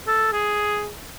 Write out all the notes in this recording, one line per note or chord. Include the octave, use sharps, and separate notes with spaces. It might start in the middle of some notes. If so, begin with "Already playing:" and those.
A4
G#4